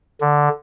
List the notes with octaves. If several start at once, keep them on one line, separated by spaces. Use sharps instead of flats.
D3